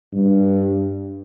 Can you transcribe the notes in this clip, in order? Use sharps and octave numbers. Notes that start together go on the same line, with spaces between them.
G2